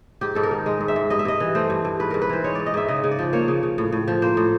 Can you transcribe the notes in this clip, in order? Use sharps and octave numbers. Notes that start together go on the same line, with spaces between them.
G#2 G4
G#2 A4
A#4
D#3
G#3
G#2
E5
G#2
G2 D#5
E5
G2 D#5
E3
A3 C5
G2
G2
G#2 B4
G#2 A#4
B4
E3 C5
G#3 C#5
G#2 D5
D#5
G#2 E5
C#3 D#5
C#3
D5
F3
A#3 C#5
C#3
C#3
A2
A2
F3
A#3 C5
A2